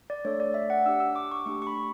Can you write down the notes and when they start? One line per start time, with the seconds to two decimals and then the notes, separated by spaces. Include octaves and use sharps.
0.10 D5
0.25 A3 D4 A4 C#5
0.40 D5
0.54 E5
0.70 F#5
0.86 D4 G4 E6
1.00 E6
1.16 D6
1.32 C#6
1.46 A3 D4 G4 C#6
1.62 C#6
1.67 B5